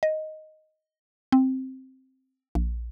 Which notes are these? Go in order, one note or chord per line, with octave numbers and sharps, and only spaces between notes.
D#5
C4
A#1